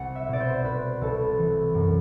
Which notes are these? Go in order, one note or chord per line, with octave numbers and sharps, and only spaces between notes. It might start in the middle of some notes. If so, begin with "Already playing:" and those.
Already playing: C2 F#5
E5
B2 D5
C5
C2 B4
C2 A4
E3
F#2